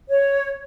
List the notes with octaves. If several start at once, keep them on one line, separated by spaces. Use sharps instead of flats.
C#5